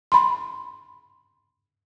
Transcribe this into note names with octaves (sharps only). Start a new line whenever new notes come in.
B5 C6